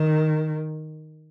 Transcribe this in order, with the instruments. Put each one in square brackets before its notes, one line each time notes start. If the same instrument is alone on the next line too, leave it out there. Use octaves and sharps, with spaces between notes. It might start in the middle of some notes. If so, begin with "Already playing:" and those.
Already playing: [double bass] D#3